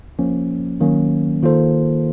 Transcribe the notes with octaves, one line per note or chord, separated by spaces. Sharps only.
F3 A#3 C#4
D#3 F#3 A#3 C#4
D#3 A#3 F4 A4 C5